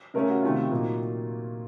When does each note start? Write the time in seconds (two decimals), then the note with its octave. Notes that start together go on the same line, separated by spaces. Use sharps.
0.14 C#3 A3 C#4 A#4
0.29 F#4
0.42 C3 D#3 A3 F4
0.70 A#2 F#3 A#3 D#4